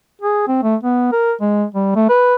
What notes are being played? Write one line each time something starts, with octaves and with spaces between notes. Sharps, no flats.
G#4
C4
A3
B3
A#4
G#3
G3
A3
B4